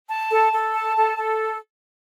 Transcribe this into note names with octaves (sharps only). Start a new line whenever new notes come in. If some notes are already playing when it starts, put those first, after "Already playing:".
A5
A4
A4
A5
A4
A4